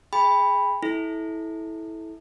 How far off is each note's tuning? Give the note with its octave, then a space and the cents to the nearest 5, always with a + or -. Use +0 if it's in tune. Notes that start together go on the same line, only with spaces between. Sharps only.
G#4 +0 G5 +35 B5 +0
E4 -20 A4 -20